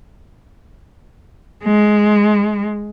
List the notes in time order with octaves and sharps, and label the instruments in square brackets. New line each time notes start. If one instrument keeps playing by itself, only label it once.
[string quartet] G#3